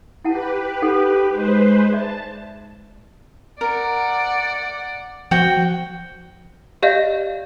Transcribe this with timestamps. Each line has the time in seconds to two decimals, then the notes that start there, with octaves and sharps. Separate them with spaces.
0.25 E4 G4 B4 F#5 A5
0.82 D#4 A4 F#5
1.29 G#3 B4 C5
1.92 D5 E5 A5
3.61 A#4 D5 F#5
5.31 F3 F#4 G5
6.83 G4 D5 D#5 F5 G6 A#6